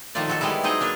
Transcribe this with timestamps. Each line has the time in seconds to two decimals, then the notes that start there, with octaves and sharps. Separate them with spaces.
0.15 D#3 F3 A3 F4 D5
0.28 F#3 F#4 A4
0.41 G3 G#3 B3 E4
0.63 F#3 C4 D#4 G#4 D#5
0.80 A#3 D4 A#4 B4